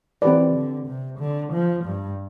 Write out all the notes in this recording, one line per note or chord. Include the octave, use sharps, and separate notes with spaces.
E3 C4 G4 B4 D5
D3
C3
D3
F3
G2